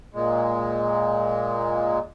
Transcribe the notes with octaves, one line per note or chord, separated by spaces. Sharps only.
A#2 G#3